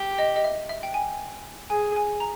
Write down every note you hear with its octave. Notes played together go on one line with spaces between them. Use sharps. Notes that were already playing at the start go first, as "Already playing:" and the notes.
Already playing: G4
D#5
D#5
E5
E5
G5
G#5
G#4 G#5
G#5
A#5